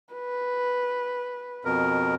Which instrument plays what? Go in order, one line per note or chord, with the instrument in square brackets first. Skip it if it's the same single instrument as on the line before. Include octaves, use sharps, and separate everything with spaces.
[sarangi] B4
[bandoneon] F2 B2 A#4